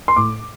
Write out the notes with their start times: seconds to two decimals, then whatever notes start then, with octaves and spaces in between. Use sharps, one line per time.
0.08 C6
0.16 A2 D6